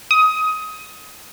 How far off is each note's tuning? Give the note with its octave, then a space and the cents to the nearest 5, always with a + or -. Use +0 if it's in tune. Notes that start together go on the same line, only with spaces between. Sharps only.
D#6 +20